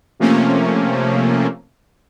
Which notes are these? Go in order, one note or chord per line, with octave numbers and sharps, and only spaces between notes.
C3 F3 A3 A#3 C#4